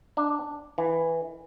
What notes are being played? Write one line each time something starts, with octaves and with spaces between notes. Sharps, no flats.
D4
E3